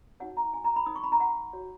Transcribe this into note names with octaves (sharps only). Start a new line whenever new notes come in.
D#4 F#4 C#5 F#5
A#5
G#5
A#5
B5
D#4 A#4 C#5 D#6
C#6
B5
A#5
F#5
F#4 C#5